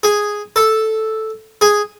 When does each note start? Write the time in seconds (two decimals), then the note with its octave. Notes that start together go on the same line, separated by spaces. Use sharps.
0.03 G#4
0.56 A4
1.61 G#4